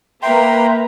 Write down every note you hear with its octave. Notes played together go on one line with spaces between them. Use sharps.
A#3 B4 E5 G5 A#5 C6